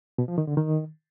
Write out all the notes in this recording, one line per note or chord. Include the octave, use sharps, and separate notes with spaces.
B2
F3
D#3
D3
D#3